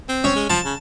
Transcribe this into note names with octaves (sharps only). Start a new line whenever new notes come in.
C4
C#4
G#3
F3 A5
C#3